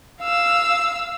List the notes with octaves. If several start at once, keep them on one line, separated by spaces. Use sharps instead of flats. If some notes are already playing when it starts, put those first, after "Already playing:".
F5 E6